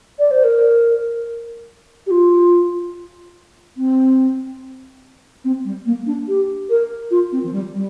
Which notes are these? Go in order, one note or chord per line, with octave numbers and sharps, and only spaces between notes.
D5
C5
A#4
G4
F4
C4
C4
G3
A#3
D4
G4
A#4
F4
C4
F3
G3
G3